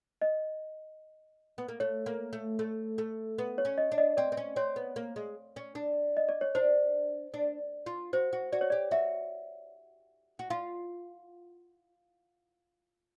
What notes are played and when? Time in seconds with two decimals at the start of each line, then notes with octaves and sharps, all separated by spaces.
0.22 D#5
1.58 B3
1.68 A#3
1.80 A3 C#5
2.06 A#3
2.33 A3
2.59 A3
2.98 A3
3.38 B3
3.58 C#5
3.65 C#4
3.78 D#5
3.92 D4
3.98 D#5
4.17 C4 D5
4.32 C4
4.37 C#4
4.56 C4 C#5
4.76 B3
4.96 A#3
5.16 G#3
5.56 C#4
5.75 D4
6.17 D#5
6.29 D5
6.41 C#5
6.55 D4 C5
7.34 D4
7.86 F4
8.13 F#4 C5
8.33 F#4
8.52 F#4 D5
8.61 C#5
8.70 G4 D5
8.91 F#4 E5
10.39 F#4
10.50 F4 F5